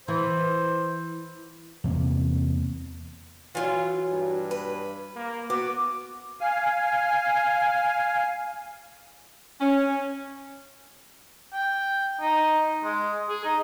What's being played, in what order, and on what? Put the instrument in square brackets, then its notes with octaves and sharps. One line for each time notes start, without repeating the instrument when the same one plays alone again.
[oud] E3 [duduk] C5
[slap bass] E2 C3 A#3
[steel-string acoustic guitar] E3 F#3 [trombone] F4
[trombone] G2
[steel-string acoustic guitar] B4
[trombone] A#3
[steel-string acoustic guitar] B3 [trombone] F#4 [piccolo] D6
[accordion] F5 G#5
[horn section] C#4
[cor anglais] G5
D#4
G#3
G#4
D#4